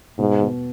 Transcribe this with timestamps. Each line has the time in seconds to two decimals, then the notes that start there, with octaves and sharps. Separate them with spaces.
0.19 G#2 B2
0.42 B2